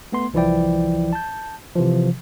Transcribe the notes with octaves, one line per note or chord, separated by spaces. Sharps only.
A3 B3 C6
C2 E3 F3 E4 D5 G5
A5 G6
C3 E3 F3